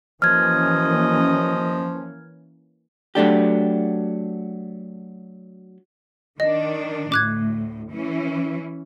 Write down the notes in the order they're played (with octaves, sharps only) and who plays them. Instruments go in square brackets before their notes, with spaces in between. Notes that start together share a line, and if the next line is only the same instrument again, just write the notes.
[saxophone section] F#2 D#5 [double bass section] E3 A#3 C#4 [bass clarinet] F3 [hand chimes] F6 G#6
[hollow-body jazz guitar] F#3 A3 D4 G4
[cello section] D#3 D4 [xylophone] D#5
[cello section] D2 A2 [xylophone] D6 F#6 G#6
[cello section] E3 C#4 E4